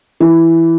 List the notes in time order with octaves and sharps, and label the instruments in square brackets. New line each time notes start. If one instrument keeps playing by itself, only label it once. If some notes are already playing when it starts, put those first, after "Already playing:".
[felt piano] E3